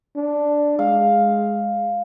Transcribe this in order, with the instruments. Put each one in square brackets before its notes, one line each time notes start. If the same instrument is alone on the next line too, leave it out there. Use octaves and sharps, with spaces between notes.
[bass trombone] D4
[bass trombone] G#3 [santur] F5